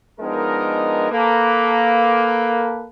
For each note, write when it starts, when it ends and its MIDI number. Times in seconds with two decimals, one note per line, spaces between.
0.20 1.10 53
0.20 1.10 56
0.20 1.10 59
0.20 1.10 62
0.20 1.10 63
0.20 1.10 70
1.11 2.88 58
1.11 2.88 69
1.11 2.88 71